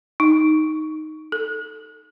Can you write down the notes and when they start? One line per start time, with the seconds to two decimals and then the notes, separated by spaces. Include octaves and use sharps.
0.20 D#4
1.32 A4